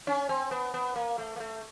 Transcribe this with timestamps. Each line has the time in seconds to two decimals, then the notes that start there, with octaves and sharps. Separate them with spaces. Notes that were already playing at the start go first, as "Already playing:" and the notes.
0.07 C#4
0.29 C4
0.51 B3
0.74 B3
0.96 A#3
1.18 A3
1.36 A#3
1.40 A3